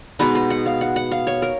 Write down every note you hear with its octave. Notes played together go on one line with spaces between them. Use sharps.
B2 G#3 B3 D#4 B4
B4
F#5
F5
F#5
F#5
F5
C#5
A#4